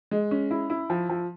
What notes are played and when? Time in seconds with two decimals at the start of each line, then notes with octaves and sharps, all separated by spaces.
0.11 G#3
0.31 C#4
0.51 E4
0.70 E4
0.90 F3
1.09 F3